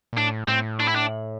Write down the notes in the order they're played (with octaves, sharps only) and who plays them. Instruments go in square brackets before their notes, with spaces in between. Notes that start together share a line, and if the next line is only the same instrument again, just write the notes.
[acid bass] A#2
[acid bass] A2 [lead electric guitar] D4
[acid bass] A2 [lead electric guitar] C4
[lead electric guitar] D4
E4
D4